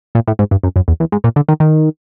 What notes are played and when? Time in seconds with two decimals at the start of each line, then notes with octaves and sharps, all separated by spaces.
0.15 A#2
0.28 A2
0.39 G#2
0.51 G2
0.63 F#2
0.76 F#2
0.88 E2
1.00 E2
1.12 G#2
1.24 A#2
1.36 D3
1.48 D#3
1.60 D#3